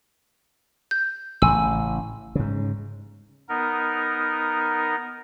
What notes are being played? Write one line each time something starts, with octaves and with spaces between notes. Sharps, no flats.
G6
A1 A2 C#3 G#5 E6
G#2 C#3
B3 D#4 A#4